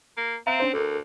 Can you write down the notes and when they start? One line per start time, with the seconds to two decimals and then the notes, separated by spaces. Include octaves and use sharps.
0.17 A#3
0.47 C4 E5 F5 A#5
0.60 C#4 D4 C5
0.74 D2 A4 A#4